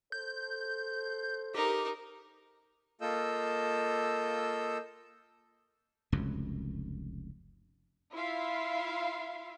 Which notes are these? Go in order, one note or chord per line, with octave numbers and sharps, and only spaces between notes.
A4 C5 G6
D#4 G4 A#4
A#3 F4 A4 D#5 E6 G6
F1 C#2 F#2
E4 F4 E5 F5 C6